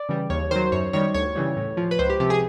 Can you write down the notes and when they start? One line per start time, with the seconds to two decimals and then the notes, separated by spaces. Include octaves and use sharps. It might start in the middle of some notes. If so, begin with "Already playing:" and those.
Already playing: D5
0.09 C#3 E3 G3
0.30 D#2 C#5
0.51 D#3 F#3 C5
0.72 F#2 C#5
0.93 D#3 G3 C#5
1.14 D2 C#5
1.36 C#3 E3 G3
1.57 A2
1.77 F3
1.91 B4
1.99 C#2 C5
2.10 G4
2.20 C3 F3 G4
2.30 G#4